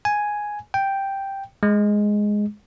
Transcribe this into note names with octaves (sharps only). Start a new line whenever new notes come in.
G#5
G5
G#3